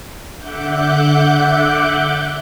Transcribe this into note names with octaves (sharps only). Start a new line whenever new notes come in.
D3 E5 F#5 D6 F#6 G6